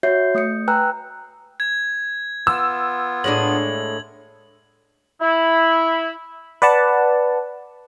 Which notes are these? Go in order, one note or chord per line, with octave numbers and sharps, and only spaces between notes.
F#4 C#5 E5 G6 C7
A3 D#6 G6 C#7
B4 G5 G#5 A#5 E6 F#6
G#6
B3 F4 E6
A2 G#3 D4 F#7
E4
B4 D5 F#5 A5